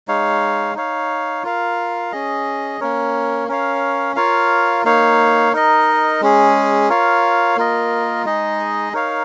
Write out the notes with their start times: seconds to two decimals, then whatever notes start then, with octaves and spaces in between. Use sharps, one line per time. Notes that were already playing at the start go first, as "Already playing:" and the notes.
0.08 G#3 D#4 C#5 F5
0.75 D#4 C#5 F5
1.43 F4 A#4 F5
2.12 C#4 G#4 D#5
2.80 A#3 C#4 A#4 C#5
3.48 C#4 A#4 C#5 F5
4.16 F4 A#4 C#5 F5
4.85 A#3 D#4 C#5 F5
5.53 D#4 A#4 D#5
6.21 G#3 C#4 G#4
6.89 F4 A#4 C#5 F5
7.56 A#3 F4 A#4 D#5
8.24 G#3 D#4 G#4 D#5
8.93 D#4 A#4 C#5 F5